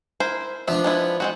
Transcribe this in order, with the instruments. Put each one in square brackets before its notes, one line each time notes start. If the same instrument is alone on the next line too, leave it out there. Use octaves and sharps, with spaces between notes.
[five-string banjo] E4 A#4 C5
[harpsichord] F3 D4 [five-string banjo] B3 E5
[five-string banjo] G#3 B3 E4
G#3 C4 F#4